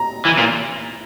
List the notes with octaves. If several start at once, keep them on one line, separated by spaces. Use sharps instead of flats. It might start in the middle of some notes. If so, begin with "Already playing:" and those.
Already playing: A#5
E3
A#2